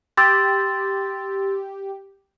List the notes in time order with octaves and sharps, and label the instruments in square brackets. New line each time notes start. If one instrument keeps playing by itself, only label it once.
[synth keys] G4 [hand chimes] C6 E6 [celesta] A6